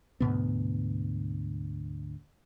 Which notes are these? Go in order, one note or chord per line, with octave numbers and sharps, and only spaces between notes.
D2 G#2 B2 B3